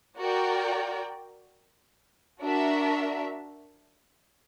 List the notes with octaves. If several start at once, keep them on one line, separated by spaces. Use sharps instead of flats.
F#4 A#4 D5 G5
D4 F#4 A#4 E5